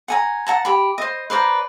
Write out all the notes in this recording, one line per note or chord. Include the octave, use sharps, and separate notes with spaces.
F#5 G#5 A#5
F#5 A5 A#5
G4 B5
C5 D#5
B4 C5 D5 A#5